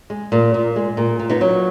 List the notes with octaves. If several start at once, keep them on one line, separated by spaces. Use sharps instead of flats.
G#3
A#2
A#2
G#3
A#2
A#2
B3 D#4
F#3